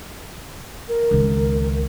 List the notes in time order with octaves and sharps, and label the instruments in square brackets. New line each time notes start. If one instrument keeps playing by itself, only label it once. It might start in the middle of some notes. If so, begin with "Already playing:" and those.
[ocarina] A#4
[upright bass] C#2 D#3